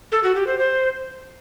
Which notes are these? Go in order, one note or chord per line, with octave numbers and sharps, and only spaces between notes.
A4
F#4
G4
C5
C5